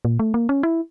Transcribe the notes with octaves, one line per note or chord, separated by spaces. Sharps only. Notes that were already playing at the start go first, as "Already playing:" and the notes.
A#2
A3
A#3
C#4
E4